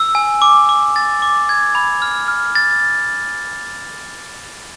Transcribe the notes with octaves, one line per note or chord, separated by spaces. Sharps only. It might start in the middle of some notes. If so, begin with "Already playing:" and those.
Already playing: E6
G#5
D6
D6
A6
D6
G#6
B5
F6
F6
A6